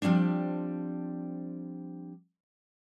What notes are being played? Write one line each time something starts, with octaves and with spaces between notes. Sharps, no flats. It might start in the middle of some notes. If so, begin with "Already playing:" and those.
F3 G3 A#3 C4 D4